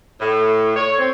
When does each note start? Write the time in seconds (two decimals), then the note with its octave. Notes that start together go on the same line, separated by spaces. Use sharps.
0.21 A2
0.76 C#5
0.99 C4